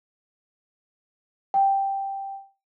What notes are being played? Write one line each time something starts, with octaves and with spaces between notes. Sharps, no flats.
G5